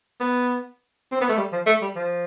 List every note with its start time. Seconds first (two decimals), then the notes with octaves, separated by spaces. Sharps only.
0.20 B3
1.12 C4
1.21 B3
1.29 A3
1.38 G3
1.52 F3
1.66 A3
1.82 G3
1.96 F3